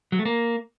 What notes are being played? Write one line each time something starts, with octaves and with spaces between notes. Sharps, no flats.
F#3
A3
A#3